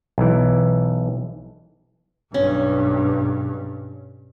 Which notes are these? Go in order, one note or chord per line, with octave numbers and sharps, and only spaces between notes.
B1 E3
B1 G2 C#4